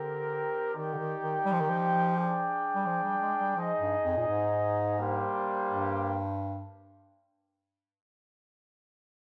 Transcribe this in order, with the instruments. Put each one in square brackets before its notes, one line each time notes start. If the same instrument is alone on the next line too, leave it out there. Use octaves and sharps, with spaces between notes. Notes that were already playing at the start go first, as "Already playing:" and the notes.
Already playing: [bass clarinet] D3 [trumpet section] C4 G4 A#4
[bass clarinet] D#3 [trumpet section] D#4 G4 D5 G5
[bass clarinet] D3
D#3
D#3
G3
F3
D#3
F3
[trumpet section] D4 G#4 D5 G5
[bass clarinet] G3
F3
G3
G#3
G3
[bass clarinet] F3 [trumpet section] D#4 G#4 D#5
[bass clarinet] G2
F2
A#2
G#2
[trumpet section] G3 A#3 D4 G4 C5
[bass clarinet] G2